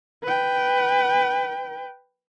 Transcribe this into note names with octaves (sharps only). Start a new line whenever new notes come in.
B4 G5